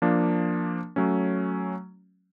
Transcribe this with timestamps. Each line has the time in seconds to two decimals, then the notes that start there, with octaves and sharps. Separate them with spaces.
0.02 F3 A#3 D4
0.96 F#3 A3 C#4